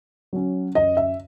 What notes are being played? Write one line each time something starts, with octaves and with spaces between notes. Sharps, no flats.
F#3 C#4
F#2 D#5
E5